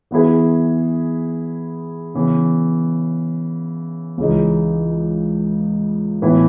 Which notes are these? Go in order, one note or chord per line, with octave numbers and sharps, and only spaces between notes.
E3 B3 E4 G#4 B4
C#3 E3 B3
C#2 C#3 E3 G#3 D#4
A2 E3 B3 E4 B4